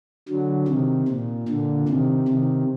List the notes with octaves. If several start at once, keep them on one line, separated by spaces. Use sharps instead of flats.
D3 F#3
C3 D#3
A#2
A#2 D3
C3 D#3
C3 D#3